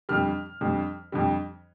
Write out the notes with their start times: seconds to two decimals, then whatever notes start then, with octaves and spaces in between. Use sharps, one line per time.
0.09 F2 D3 G3 F6
0.61 F2 D3 G3
1.12 F2 D3 G3